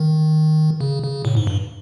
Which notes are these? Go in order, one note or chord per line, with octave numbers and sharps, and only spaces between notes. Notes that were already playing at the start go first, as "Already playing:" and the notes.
Already playing: D#3
C#3
C#3
A2
G#2
G2